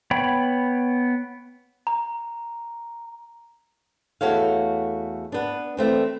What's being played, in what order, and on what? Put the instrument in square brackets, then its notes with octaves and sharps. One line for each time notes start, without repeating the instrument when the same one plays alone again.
[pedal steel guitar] B3 C#5 G5 B5
[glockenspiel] A#5
[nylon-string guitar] E2 A3 F#4 A4 C#5 F5
B3 D4
E3 A3 C4 D4